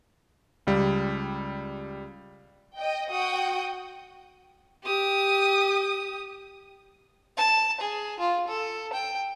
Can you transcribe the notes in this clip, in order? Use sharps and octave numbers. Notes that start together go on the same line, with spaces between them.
C#2 G3
D#5 G5
F#4 F#5 G5 D#6
G4 D#6
A5
G#4
F4
A4
G5